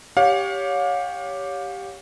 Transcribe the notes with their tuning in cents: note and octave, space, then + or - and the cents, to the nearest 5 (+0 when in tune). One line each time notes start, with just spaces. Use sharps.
G4 +0 C#5 +15 F5 +35